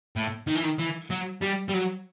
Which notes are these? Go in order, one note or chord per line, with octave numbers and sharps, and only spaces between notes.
A2
D#3
E3
D#3
E3
F#3
G3
G3
F#3